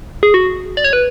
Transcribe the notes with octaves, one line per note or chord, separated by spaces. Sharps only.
G#4
F#4
D5
C#5
B4